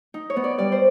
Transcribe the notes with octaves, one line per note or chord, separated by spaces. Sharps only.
D#4
C#5
B3
D5
G3 D5
C5